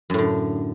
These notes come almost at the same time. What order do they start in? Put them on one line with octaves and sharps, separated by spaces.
F#2 A2 D3